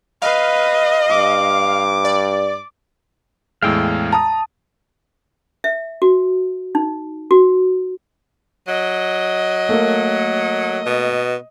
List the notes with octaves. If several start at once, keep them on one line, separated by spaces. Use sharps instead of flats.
B4 D#5 F5
G2 D6
D5
E2 A2 G#3 F5 G5 E6
A5 A#5 D#6
E5
F#4
D#4
F#4
F#3 D#5
A3 A#3 A#4
B2